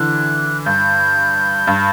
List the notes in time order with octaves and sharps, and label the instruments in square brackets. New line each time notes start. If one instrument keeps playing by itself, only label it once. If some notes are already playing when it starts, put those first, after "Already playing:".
Already playing: [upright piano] D3 E3 [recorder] F#6
[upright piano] G2 [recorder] G6
[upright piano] G2